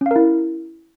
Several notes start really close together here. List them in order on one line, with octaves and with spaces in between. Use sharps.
C#4 F5 A#4 E4